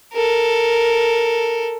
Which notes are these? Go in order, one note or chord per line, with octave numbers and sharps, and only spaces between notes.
A4 A#4